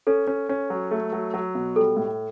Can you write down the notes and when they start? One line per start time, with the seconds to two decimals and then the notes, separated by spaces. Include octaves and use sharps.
0.07 C#4 A4
0.27 C#4
0.49 C#4
0.70 F#3
0.91 A3
1.13 F#3
1.34 F#3
1.55 B2
1.76 G3 A4
1.97 A2